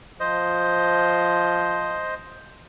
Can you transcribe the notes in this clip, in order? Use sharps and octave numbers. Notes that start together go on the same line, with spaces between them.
F3 C5 D#5